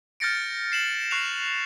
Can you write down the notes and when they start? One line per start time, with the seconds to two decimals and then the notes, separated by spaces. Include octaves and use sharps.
0.20 F6 G6 A6 A#6 C#7 D7
0.72 C7 E7 F#7
1.11 C#6 F#6 C7 F7